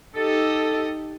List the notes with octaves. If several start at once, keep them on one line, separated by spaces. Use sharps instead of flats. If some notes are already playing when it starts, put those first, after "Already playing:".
D#4 G4 A4 D#5